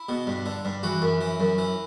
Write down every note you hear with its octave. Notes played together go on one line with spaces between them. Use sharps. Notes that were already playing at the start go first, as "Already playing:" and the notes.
Already playing: E4
B2
G2
D3
G2
E3 F#4
F#2
E3
F#2
E3